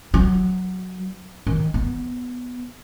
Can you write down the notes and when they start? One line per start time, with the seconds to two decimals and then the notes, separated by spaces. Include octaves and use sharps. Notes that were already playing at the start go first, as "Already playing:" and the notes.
0.14 F#3
1.47 D#3
1.74 B3